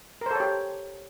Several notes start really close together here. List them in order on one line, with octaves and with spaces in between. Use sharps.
A#4 C5 A4 C#5 G4